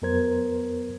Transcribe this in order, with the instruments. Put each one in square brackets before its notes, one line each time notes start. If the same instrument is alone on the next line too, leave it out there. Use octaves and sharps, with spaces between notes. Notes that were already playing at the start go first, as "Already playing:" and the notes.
[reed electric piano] F2 F#3 B3 A#4 C5 G#6